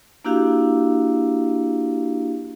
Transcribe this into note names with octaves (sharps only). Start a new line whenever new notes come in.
A#3 D4 E4 F#4 G4 F5